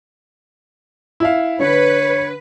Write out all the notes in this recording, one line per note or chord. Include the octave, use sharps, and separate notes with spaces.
E4 E5 F5
D3 B4 C#5